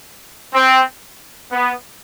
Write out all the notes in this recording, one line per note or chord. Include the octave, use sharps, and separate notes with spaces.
C4
B3